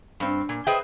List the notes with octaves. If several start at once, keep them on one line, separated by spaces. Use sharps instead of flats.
G2 C4
A#2
G#4 B4 C5 D#5 E5 G5